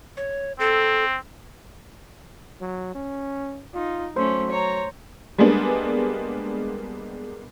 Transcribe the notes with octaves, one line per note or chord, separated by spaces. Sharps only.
C#5
C4 A4
F#3
C#4
D#4 F4
F#3 A3 C#4 C5
C#5 A#5
G3 G#3 A#3 B3 D4